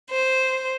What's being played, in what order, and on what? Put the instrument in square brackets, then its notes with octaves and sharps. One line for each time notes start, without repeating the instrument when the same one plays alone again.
[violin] C5